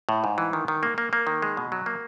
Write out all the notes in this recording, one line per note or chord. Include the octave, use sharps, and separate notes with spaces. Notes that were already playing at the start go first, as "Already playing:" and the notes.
A2
G#2
E3
D#3
D#3
A#3
A#3
A#3
D#3
G#3
B2
F#3
A#3